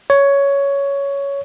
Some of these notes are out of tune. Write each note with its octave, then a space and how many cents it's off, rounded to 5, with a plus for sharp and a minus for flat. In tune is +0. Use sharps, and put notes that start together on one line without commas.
C#5 +10